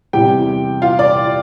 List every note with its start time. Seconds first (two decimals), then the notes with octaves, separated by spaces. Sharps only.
0.13 E2 C3 G3 G4 G5
0.82 F4 F5
0.99 D5 D6